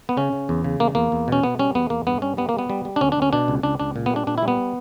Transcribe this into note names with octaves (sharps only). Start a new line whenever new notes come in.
B3
C#3 C#4
C#3
E2
C#3
E2 A#3
E2 A#3
E2
B2 C#4
B2 B3
G3 C#4
E2 B3
E2 A#3
G2 B3
G3 C#4
G3 B3
A#3
G3 B3
G3
G3
D4
D2 C#4
D4
D2 C#4
B2 D4
C#2
C#2 D4
C#2 D4
A#2
B3
G3
D4
A#2 D4
E4
G3
B3